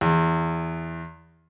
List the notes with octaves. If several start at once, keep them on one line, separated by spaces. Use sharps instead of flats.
E2